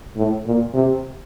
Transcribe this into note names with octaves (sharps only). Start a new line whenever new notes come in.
A2
A#2
C3